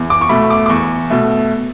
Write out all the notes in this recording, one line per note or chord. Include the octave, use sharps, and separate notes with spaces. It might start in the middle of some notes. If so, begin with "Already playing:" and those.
Already playing: E2
D6
C#6
B2 A3 B5
D6
D6
E2 C#6
B2 A3